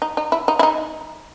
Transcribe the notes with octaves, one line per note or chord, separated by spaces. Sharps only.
D#4
D#4
E4
D#4
E4
D#4